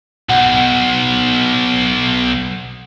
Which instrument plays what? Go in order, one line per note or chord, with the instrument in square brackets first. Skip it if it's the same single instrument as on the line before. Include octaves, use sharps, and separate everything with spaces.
[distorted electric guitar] B1 [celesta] F#5